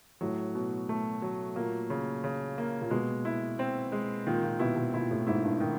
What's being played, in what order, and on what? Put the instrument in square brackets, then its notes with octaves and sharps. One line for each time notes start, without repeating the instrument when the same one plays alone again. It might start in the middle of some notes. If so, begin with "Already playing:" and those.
[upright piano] A2 [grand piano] F#3
[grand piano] B2
A3
F#3
[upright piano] A#2 [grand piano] A#3
[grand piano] C#3
C#3
A#3
[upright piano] A#2
[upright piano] B2 [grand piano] G#3
[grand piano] E4
C4
G#3
[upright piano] A#2 [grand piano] D#3
[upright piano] A#2
[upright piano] B2 [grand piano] E4
[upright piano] B2
[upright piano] A#2 [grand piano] E4
[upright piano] A2
[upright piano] G#2 [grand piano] E4
[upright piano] G2
[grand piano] D#3